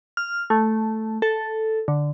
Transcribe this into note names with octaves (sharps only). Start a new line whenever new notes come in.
F6
A3
A4
D3